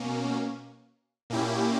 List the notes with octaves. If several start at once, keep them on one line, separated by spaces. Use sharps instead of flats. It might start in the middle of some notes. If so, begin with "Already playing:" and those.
Already playing: B2 A#3 C#4
A#2 A#3 C#4 E4 G4